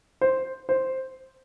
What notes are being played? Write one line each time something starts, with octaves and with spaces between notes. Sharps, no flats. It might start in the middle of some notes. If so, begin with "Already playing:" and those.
C5
C5